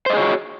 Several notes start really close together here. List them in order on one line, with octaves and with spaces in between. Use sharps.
C5 D#5 G#4 C#5 F#4